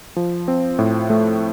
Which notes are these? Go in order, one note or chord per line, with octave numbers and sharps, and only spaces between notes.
F3
C4
A2
A3